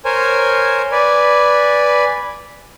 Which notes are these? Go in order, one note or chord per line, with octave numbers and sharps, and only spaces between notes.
A#4 C5 C#5 G#5
B4 D5 G#5